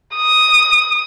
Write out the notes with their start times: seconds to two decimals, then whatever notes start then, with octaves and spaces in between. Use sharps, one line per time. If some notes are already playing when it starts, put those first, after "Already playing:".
0.16 D#6